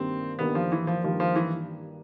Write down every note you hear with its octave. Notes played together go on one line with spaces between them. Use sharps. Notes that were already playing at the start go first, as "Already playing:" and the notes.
Already playing: G2 D#3 G3 A#3 C4
G2 D#3 G3 A#3 B3
F3
E3
F3
G2 D#3 F3 G3 A#3
F3
E3